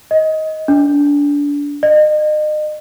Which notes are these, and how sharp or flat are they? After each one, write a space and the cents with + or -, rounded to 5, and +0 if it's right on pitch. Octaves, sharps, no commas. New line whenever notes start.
D#5 +20
D4 -25
D#5 -35